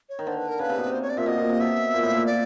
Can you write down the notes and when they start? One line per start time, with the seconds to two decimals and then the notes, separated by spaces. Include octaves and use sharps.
0.09 C#5
0.19 D#3
0.27 D3 C5
0.38 B4
0.48 A#4
0.59 C#3 B4
0.69 C3
0.78 B2
0.86 C3
0.93 C5
1.02 C#5
1.10 D5
1.17 A#2 E5
1.26 B2 D#5
1.38 A#2
1.49 C3
1.60 B2 E5
1.94 A#2
2.03 A2
2.14 A#2
2.26 D5